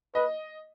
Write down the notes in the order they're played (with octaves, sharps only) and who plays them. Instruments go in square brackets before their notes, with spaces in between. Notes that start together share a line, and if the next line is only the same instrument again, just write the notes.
[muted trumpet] B4 [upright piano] D#5